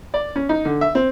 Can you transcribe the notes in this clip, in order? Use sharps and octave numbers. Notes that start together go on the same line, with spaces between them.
D5
C#4
D#4
D3
E5
C4